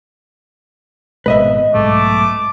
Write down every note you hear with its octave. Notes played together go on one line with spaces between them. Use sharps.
G#1 B2 G#3 B4 D#5 E5
B1 G#2 G#3 A3 D6